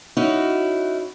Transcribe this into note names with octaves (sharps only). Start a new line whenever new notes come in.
C#4 D#4 E4 F#4